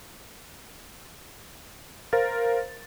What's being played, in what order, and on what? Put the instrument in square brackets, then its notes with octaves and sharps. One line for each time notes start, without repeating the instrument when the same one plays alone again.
[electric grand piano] A#4 C5 F5 A6